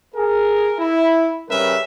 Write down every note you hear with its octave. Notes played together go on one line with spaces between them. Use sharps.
G#4 A#4
E4
C#3 G3 C#4 A#4 B4 E5